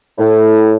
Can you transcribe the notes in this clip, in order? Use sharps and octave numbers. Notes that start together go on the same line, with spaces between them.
A2